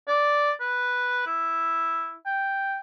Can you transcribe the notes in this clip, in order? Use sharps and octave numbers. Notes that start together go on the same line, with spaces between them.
D5
B4
E4
G5